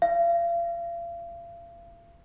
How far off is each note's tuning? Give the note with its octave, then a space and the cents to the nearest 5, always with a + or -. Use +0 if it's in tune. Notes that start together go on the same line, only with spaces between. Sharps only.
F5 -40